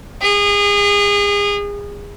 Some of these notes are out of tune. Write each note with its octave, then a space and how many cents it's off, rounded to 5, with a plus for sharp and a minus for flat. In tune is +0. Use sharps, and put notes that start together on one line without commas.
G#4 -30